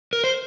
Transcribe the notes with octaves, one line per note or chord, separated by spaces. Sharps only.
A#4
C5